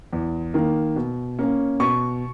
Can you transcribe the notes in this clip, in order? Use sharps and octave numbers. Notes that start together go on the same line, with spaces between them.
E2
D#3 A#3
B2
A#3 C#4
B2 C#6